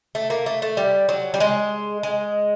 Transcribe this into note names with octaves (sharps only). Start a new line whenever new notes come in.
A3
A#3
A3
A3
G3
F#3
G3
G#3
G#3